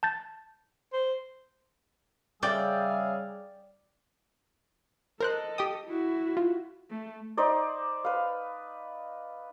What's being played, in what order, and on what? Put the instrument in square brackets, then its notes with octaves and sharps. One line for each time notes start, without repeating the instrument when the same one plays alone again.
[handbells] A5 G6 A6
[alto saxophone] C5
[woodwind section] C#3 G3 [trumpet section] G#4 E5 F5 [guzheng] D5 G5
[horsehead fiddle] A4 D#5 [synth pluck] A#4 C5 F#6
[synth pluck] G4 G5 D#6
[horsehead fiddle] E4 F#4
[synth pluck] F4
[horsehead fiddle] A3
[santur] D#4 C5 D5
B4 F5